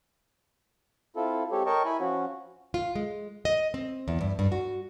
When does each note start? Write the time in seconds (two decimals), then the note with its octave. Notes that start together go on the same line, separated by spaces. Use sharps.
1.16 C4 E4 F4 A4
1.51 G#3 C4 G4 A4 C#5
1.66 A#4 C#5 D#5 G5 A5 C#6
1.85 E4 G#5 B5
2.00 F3 C#4 F#4
2.74 F4
2.95 G#3
3.45 D#5
3.74 C4
4.08 E2
4.21 G2
4.39 G2
4.52 F#4